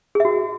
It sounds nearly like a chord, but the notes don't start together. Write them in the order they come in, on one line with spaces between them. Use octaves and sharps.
G#4 E5 F#4